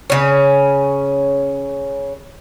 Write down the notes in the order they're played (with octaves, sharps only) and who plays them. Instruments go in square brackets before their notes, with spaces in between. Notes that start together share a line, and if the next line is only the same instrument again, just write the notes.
[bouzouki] C#3 C#4